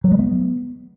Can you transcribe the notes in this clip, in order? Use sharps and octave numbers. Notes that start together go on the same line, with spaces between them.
F#3
G#3
B3